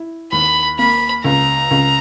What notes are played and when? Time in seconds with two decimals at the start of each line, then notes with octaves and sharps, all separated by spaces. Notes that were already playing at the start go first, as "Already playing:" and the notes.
Already playing: E4
0.32 D#2 B5
0.78 A#3 B5
1.24 C#2 A#5
1.71 C#2